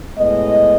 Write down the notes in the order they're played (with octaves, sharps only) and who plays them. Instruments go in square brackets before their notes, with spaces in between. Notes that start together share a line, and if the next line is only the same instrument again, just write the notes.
[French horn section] A2 G#3 B3 D#5